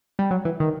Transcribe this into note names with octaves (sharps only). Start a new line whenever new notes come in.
G3
F#3
E3
D#3